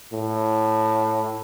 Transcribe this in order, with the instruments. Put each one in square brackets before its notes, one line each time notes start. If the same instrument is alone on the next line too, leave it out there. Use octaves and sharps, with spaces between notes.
[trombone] A2